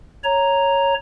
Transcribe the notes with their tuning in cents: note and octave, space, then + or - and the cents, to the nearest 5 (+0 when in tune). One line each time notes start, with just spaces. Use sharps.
C#5 +0 A#5 +0